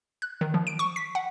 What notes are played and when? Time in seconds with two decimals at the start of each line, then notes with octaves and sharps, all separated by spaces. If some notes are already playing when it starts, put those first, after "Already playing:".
0.22 F#6
0.41 D#3
0.54 F3
0.67 D7
0.79 C#6
0.96 B6
1.15 F#5